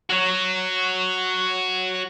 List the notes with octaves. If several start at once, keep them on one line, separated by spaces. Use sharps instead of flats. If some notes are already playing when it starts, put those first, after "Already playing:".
F#4 C#5